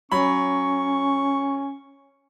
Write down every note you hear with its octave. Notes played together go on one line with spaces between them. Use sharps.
F#3 C#4 B5 C#6